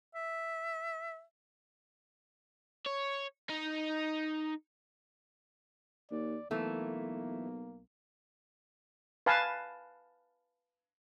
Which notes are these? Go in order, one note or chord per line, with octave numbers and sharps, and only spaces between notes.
E5
C#5
D#4
D#2 D5
B1 E3 A3 A#3
B4 F5 G#5 A5